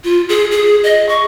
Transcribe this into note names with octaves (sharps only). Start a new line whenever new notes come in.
F4
G#4
G#4
D#5
C#6